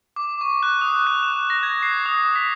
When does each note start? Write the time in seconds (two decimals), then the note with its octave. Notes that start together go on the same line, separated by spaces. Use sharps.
0.16 D6
0.41 C#6
0.63 F#6
0.81 D#6
1.07 F#6
1.23 E7
1.50 A#6
1.63 G#6
1.83 C7
2.06 D#6
2.36 B6